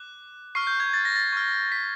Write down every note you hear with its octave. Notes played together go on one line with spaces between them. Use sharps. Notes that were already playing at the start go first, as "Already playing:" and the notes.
Already playing: D6 F#6
C#6 F6 C7
G6
G#6
A6
A#6
A6
C#6 F6
B6